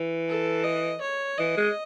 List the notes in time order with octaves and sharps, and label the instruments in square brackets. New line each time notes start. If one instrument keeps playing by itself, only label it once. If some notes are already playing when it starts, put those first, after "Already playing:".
Already playing: [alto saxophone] E3
[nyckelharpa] A4
D#5
C#5
[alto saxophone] E3 [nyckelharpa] D#5
[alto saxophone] G#3